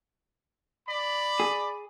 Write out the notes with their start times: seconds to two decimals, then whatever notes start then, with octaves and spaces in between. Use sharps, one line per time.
0.88 D5 B5
1.40 G#4